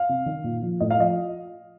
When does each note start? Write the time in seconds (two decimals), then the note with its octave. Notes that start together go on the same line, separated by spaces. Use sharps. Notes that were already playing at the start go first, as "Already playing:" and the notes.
Already playing: F5
0.09 C3
0.26 D#3
0.44 A#2
0.62 F3
0.80 A2 D#5
0.90 F5
0.98 F3 D#5